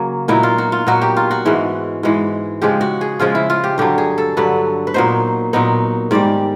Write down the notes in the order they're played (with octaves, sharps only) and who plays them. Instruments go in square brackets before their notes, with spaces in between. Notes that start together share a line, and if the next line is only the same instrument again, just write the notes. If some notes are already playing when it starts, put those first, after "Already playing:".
Already playing: [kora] C#3 F#3 A#3
A#2 F#3 B3 D#4 E4
F4
F#4
F4
A#2 F#3 B3 D#4 F#4
G4
F4
F#4
G#2 E3 G#3
G#2 E3 G#3
C#3 F3 G#3 G4
F#4
G#4
C#3 F3 G#3 F4
E4
F4
G4
G2 D3 F#3 G4
G#4
A4
G2 D3 F#3 B4
B4
A#2 F#3 B3 D#4 C5
A#2 F#3 B3 D#4
G#2 D#3 G3 D5